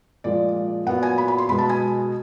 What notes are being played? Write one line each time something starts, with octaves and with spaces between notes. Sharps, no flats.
A#2 F3 G#3 D5
A#2 F#3 B3 F#5
G#5
B5
B5
C6
B2 G#3 B3 B5
A5
G#5